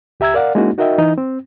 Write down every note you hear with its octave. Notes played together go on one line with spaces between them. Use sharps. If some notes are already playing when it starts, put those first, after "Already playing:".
C#2 G4 E5 A#5 E6 G#6
A#4 D5 F5 F#5
G#3 A#3 C#4 D#4 E4 F#4
D#4 F#4 A#4 D#5 E5 G5
E3 D#4
C4